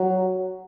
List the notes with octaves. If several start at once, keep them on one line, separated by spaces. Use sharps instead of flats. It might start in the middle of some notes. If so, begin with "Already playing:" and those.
Already playing: F#3